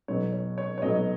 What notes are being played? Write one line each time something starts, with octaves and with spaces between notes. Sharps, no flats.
B1 B2 F#3 C#5
C#5
C#5
C#5
B1 B2 F#3 D#5